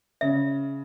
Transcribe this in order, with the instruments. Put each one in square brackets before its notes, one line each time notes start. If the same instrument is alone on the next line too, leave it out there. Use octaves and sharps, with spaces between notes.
[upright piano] C#3 [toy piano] E5